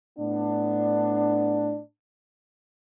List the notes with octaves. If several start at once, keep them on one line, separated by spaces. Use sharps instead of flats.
A2 B3 D4